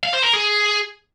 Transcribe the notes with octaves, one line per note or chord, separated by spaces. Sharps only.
F5
C5
A#4
G#4